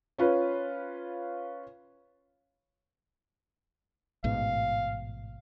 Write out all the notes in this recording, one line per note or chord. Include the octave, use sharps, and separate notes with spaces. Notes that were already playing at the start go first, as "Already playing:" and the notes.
C#4 F4 B4
A1 G#2 B2 F5